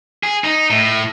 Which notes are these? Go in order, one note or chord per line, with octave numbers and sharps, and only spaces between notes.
G#4
D#4
A2